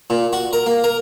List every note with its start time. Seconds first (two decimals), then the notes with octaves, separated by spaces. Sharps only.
0.10 A#2
0.33 F#4
0.53 A#4
0.66 A#3
0.84 A#4